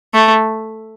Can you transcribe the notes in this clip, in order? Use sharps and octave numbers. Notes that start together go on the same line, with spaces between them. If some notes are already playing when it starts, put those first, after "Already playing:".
A3